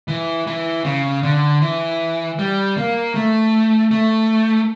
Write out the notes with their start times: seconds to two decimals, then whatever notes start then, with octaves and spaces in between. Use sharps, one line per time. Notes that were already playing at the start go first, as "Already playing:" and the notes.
0.08 E3
0.47 E3
0.85 C#3
1.23 D3
1.62 E3
2.39 G3
2.77 A#3
3.15 A3
3.91 A3